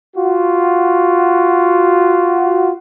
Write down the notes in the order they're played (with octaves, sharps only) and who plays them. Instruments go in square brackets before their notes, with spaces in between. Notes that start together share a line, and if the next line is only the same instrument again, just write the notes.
[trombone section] F4 F#4